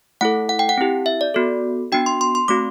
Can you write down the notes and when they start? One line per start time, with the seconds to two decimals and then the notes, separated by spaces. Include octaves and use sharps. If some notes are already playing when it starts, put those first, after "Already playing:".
0.21 A3 E4 A4 F#5
0.49 F#5
0.59 G5
0.69 F#5
0.78 C4 E4 G4
1.06 E5
1.21 D5
1.34 B3 F#4 A4
1.92 B3 D4 F#4 G5
2.06 C6
2.21 C6
2.35 C6
2.48 A3 C4 F#4 D6